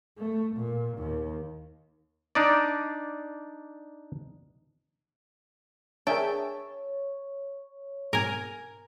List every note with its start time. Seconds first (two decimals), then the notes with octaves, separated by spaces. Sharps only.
0.18 A3
0.55 A#2
0.98 D#2
2.35 D4 D#4 D5
6.07 D4 G#4 A#4 C#5 E5 G5 A5
8.13 G#2 B2 A#4 G#5